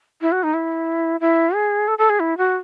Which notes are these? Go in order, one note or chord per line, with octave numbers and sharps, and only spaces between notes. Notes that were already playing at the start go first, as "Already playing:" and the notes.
E4
F#4
D#4
E4
E4
G#4
A4
A4
G#4
E4
F#4